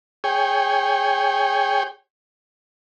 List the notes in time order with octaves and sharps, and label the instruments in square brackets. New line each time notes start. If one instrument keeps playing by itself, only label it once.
[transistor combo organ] G#4 C#5 G5